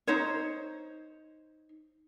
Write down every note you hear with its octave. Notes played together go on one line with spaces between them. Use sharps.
D#4 C5 C#5